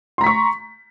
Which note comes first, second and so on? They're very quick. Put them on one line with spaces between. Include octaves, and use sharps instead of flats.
C6 A#5 B6 C#6